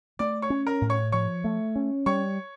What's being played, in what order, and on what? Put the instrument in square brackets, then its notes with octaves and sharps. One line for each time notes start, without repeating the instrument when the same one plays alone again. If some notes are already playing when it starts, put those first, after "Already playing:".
[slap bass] A3 [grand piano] D5 D6
[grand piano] C#5 C#6
[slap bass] C#4
[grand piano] A#4 A#5
[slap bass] A2
[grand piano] C#5 C#6
[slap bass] F3 [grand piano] C#5 C#6
[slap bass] A3
C#4
[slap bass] G3 [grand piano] C#5 C#6